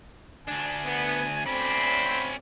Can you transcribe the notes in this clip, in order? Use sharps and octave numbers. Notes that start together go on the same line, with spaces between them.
D2 D4 G#5
B3
D2 C4 C#4 D5 B5